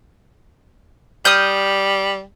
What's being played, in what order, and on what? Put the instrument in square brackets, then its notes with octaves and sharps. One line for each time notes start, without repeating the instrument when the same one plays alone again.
[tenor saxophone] G3 [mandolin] D#6 F6 G6